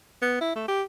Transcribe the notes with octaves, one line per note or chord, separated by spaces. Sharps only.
B3
E4
A3
G4